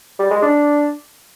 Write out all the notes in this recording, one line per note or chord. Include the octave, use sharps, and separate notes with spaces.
G3
G#3
D4